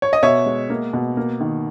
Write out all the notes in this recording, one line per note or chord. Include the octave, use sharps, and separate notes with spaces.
C#5
D#5
B2 C#5 E5
G#3
A#3
B2
A#3
D#3